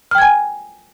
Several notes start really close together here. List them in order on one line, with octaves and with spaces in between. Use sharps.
F6 G5 G#6 G#5